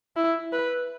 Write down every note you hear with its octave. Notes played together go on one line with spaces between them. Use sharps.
E4
B4